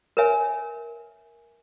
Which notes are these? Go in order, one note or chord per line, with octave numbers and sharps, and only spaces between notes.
A#4 B4 C#5 E5 G#5